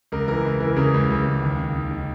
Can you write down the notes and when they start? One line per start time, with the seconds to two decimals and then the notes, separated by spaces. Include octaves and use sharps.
0.12 C#2 A#4
0.28 E3 A#4
0.45 C#2
0.60 E3 A#4
0.77 C#3 A#4
0.94 C#2
1.10 C#2
1.26 C#2
1.42 D#2
1.59 D#3
1.75 D#3
1.91 D#3